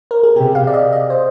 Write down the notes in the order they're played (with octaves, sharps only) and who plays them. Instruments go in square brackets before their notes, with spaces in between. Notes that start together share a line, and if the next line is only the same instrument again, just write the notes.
[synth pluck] A#4
G#4
[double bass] C3 [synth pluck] G4
[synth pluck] F5
D5
D#5
D#5
C5